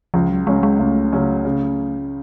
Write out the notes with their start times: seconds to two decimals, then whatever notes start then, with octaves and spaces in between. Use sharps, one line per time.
0.14 C#2 F3
0.30 F#3
0.47 C#3 F#3 G#3 C#4
0.63 G#3
0.79 C#2 A3
1.13 C#3 F#3 C#4
1.45 C#3